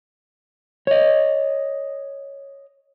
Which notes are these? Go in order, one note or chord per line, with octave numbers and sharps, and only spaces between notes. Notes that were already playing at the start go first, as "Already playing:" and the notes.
C#5 D#5